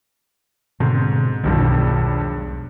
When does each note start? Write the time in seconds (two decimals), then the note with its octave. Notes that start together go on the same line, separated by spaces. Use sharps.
0.80 G#2 B2 D3 C4
1.43 E1 B1 G2 B2 D#3 F3